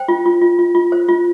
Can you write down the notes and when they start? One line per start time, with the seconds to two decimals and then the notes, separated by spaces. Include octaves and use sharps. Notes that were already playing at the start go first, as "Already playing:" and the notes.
Already playing: C5 G5
0.08 F4
0.26 F4
0.42 F4
0.59 F4
0.75 F4
0.92 C5
1.08 F4